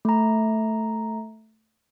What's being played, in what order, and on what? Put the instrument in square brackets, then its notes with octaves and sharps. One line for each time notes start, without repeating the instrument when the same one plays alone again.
[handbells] A3 A#5